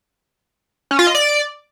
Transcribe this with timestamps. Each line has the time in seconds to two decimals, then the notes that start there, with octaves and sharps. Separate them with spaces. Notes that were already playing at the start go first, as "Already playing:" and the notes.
0.91 C#4
0.99 F4
1.07 D#5
1.15 D5